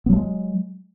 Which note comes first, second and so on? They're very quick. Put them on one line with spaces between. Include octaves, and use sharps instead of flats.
B3 F#3 A3 G#3